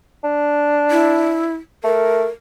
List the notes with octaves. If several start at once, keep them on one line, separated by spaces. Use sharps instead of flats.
D4
E4
A3 A#4